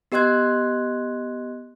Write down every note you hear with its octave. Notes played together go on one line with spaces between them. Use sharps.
B3 G4 D#5 C6 F#6 G#6